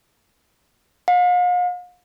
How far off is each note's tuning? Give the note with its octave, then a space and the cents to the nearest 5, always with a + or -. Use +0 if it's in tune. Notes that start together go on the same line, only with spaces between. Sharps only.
F5 +45